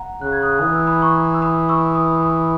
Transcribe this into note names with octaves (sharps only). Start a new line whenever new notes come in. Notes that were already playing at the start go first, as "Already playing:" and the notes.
Already playing: F#5 A#5
C#3 F#6
G#6
D#6 F#6
E3 D#6
E6
B5 D#6
A#5 C#6
E6
B5 D#6
C#6 E6
B5 D#6
B5 D#6